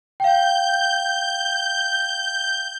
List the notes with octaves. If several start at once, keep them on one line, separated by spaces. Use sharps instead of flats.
F5 G5 G6